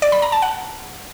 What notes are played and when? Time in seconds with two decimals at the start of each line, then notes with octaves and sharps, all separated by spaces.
0.02 D5
0.12 B5
0.22 A#5
0.32 A5
0.42 F#5